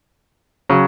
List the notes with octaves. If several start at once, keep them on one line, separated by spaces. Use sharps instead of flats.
C#3 F#3